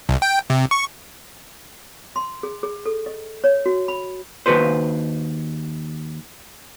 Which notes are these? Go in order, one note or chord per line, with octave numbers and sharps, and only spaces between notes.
C2
G5
C3
C#6
C6
G#4
G#4
A4
D#5
C#5
F#4
B5
D#2 B2 F#4 B4 C5